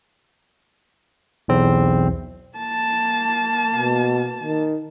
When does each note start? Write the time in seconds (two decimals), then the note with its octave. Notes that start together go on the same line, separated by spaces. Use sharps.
1.48 B1 E2 C4
2.57 A#3 A5
3.75 B2
4.44 D#3